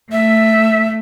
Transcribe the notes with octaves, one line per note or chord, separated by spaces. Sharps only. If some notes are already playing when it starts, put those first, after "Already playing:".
A3 E5